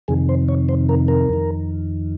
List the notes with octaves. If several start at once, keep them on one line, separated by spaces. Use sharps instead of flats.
F2 C3 D#3 G#4
C5
C#5
C5
A#4
A#4
F2 D#3